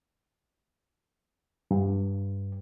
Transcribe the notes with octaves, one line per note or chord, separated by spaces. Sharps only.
G2